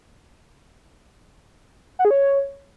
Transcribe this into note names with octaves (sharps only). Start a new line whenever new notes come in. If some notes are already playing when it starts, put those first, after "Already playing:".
F#5
G#4
C#5